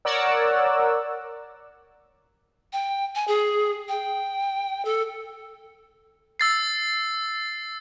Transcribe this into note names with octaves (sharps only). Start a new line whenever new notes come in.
A#4 C#5 D5 F#5 E6
G5
G#5
G#4
G5
A4
E6 A6 C7